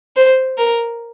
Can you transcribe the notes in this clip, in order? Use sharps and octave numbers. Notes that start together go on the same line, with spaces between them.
C5
A#4